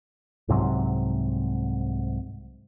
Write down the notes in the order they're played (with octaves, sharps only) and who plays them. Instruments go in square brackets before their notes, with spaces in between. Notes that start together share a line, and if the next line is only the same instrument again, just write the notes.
[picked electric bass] C2 G#2 C3 F#3